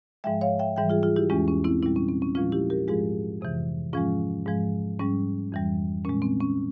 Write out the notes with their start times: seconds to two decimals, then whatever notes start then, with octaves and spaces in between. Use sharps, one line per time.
0.24 G#2 F3 G#3 E5 G5
0.41 C#5 F5
0.59 E5 G5
0.76 G#2 E3 G3 E5 G5
0.90 F4 G#4
1.03 F4 G#4
1.16 E4 G4
1.30 E2 E3 G#3 C#4 F4
1.48 C#4
1.64 C4 E4
1.82 A#2 G3 C4 E4
1.96 C#4
2.09 C4
2.22 C#4
2.35 A#2 F3 G#3 C#4 F4
2.52 E4 G4
2.70 G4 A#4
2.88 G#2 F3 G#3 F4 G#4
3.41 F2 C3 E3
3.93 G#2 F3 G#3 C#4 F4
4.46 G#2 F3 G#3
4.99 G#2 G3 C#4
5.52 F2 E3 G3
6.05 A#2 G#3 C#4
6.22 C4
6.40 C#4